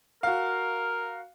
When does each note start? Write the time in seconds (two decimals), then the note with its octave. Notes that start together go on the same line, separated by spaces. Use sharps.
0.23 F#4 A#4 F5